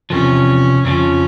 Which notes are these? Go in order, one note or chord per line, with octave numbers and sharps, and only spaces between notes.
E2 C3 F3 C#4
F2 C#3 F3 C#4